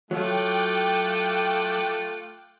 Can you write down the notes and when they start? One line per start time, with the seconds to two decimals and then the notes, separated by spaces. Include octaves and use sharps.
0.11 F#3 A3 F4 G5 D6 F#6